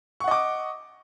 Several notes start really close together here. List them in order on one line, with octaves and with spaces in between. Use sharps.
C#6 F#5 D#5 D6